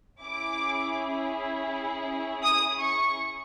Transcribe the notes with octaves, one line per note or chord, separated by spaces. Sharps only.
C#4 E4 G#4 D6
D#6
C#6